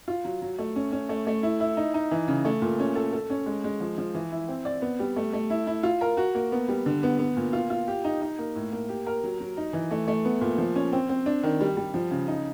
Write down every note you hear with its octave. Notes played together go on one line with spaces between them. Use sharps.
F4
F#3
F#3
A3
C#4
C#4
A3
A3
E4
E4
D#4
D#4
E3
C#3
A3
A#2
C#4
A4
A4
C#4
G#3
G#3
F3
F3
E3
E4
C4
D5
B3
G3
A3
A3
E4
E4
F4
A#4
F#4
A#3
B3
G3
D3
B3
B3
A#2
F4
F4
G4
D#4
D#4
A#3
A2
A#3
G4
A#4
F#3
F#3
D#4
E3
A3
A3
B3
A#2
F3
C#4
C4
C4
D4
D#3
G3
G3
F3
C#3
D#4